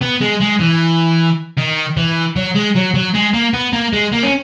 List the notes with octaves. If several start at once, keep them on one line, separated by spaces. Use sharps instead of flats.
B3
G#3
G#3
E3
D#3
E3
F#3
G#3
F#3
F#3
G#3
A#3
B3
A#3
G#3
A#3
C#4